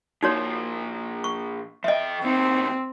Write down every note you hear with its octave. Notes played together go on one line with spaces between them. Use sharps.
A#2 F3 D#4 F#4 C#5
C#6
F3 D#5 E5 G5
D2 C4 D#4